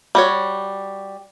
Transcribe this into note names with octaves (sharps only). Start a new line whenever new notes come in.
G3 F#4 C#5